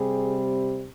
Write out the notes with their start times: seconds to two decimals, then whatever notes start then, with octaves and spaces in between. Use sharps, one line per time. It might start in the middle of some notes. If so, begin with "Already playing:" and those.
Already playing: C3 G3 G#4